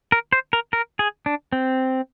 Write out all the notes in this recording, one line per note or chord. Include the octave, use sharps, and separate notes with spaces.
A#4
C5
A#4
A#4
G#4
D4
C4